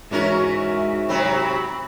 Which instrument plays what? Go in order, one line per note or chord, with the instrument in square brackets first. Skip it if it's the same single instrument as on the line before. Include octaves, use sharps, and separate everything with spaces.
[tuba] G#2 [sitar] E3 C#4 A#4 [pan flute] F#4 [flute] E5
[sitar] C3 F#3 C4 [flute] B5